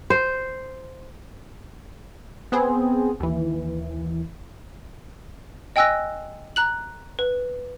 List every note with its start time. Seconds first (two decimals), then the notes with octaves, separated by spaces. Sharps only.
0.10 C5
2.52 B3 C4 G#4
3.20 D#2 E3
5.76 D#5 G5 G#5 E6 F#6 A#6
6.56 A#5 F#6 F#7
7.19 B4